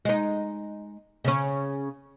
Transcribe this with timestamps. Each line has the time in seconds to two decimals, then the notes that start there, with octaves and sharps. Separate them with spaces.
0.05 G#3 D#4
1.24 C#3 C#4